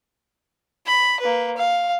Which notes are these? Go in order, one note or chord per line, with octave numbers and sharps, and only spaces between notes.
B5
A#3 B4
F5